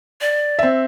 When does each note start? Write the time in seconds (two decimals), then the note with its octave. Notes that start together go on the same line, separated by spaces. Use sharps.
0.21 D5
0.59 C4 E5